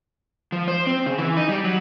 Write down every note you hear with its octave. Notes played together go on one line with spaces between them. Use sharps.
F3
C5
C4
C#3
E3
D#4
G3
F#3